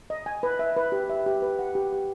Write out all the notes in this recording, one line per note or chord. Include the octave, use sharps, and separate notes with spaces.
D#5
G#5
B4
E5
B4
G4
E5
G4
B4
F#5
G4
G4